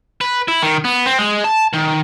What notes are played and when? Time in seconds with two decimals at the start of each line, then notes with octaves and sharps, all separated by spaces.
0.21 B4
0.48 E4
0.62 D#3
0.85 B3
1.06 C4
1.19 G#3
1.44 A5
1.74 D#3